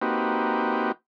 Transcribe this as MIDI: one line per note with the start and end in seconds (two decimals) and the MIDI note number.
0.02 0.92 58
0.02 0.92 60
0.02 0.92 63
0.02 0.92 66
0.02 0.92 67
0.02 0.92 71